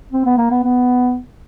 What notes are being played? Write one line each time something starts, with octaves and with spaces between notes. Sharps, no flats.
C4
B3
A#3
B3
B3